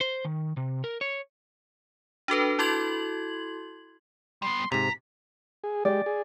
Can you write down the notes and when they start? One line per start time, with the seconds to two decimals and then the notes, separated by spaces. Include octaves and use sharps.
0.01 C5
0.25 D#3
0.57 C3
0.84 A#4
1.01 C#5
2.28 D4 F#4 A4 B4
2.59 E4 F#4 A4 C6 G#6 F#7
4.42 G3 B3 C6
4.72 G#2 C3 A#5 B6
5.64 G#4
5.85 G#3 G4 D5
6.06 G#4